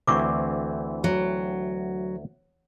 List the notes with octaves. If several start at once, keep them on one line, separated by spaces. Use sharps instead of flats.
D2 E3 C4 C#6 D6
F#3